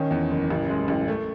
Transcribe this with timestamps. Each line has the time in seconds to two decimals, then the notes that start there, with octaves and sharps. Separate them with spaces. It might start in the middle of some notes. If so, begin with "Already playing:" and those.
Already playing: D#3 C#4
0.11 E2
0.31 F#1
0.50 A1
0.70 G#3
0.88 A1
1.08 A3